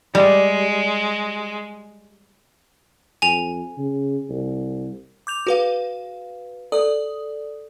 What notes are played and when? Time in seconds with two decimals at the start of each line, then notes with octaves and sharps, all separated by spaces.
0.15 G3 G#3
3.22 F2 G#5 F7
3.77 C#3
4.29 C2
5.27 D6 G6 F7
5.47 F#4 G#4 B4 F5
6.72 A4 D5 D#6